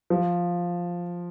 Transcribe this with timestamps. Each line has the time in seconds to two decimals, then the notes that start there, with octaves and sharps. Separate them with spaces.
0.10 F3